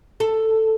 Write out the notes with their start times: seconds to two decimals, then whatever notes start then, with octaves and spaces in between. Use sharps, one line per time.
0.20 A4